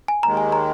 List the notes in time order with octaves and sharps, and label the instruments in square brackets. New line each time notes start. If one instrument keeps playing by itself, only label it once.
[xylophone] G#5
[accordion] D#2 D#3 G#3 [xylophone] A#5
[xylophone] G#5
A#5